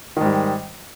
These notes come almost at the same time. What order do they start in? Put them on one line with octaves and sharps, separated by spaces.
D#3 G#2 G3